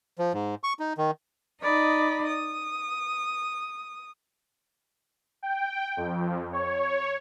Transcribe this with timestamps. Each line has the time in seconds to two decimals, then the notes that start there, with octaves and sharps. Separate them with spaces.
0.19 F3
0.34 G#2
0.64 C#6
0.79 D#4
0.98 D#3
1.61 D#4 D5 D#5 B5
2.28 D#6
5.43 G5
5.97 F2
6.52 C#5